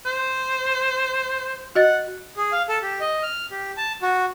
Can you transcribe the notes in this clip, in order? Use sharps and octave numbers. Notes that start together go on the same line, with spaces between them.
C5
F#4 D#5 F#5 A6
G#4
F5
A4
G4
D#5
F6
G4
A5
F#4